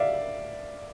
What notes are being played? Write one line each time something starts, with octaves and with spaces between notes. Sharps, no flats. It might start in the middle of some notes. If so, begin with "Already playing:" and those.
Already playing: D5 E5 F5